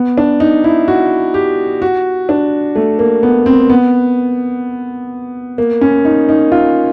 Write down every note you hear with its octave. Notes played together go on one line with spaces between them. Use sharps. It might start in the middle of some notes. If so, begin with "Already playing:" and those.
Already playing: B3
D4
D#4
E4
F#4
G4
F#4
D4
A3
A#3
B3
C4
B3
A#3
C#4
D#4
D#4
F4